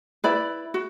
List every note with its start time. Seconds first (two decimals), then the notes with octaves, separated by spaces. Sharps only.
0.24 E4 B4 D5 B5
0.74 F#4